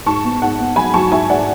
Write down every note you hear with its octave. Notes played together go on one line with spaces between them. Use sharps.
G#2 A5 C#6
B3
G#2 F#5 A5
B3
F#3 G#5 B5
F#3 A5 C#6
G#2 E5 G#5
G#2 D5 F#5